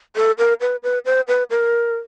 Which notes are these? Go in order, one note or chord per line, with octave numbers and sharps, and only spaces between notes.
A4
A#4
B4
B4
C5
B4
A#4